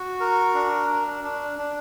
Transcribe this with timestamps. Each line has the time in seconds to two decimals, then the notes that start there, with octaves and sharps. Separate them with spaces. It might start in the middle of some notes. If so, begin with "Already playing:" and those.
Already playing: F#4
0.20 A#4
0.54 D4
0.90 D4
1.24 D4
1.59 D4